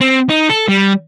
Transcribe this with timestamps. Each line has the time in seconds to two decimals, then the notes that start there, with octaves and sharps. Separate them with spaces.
0.01 C4
0.29 D#4
0.49 A4
0.68 G3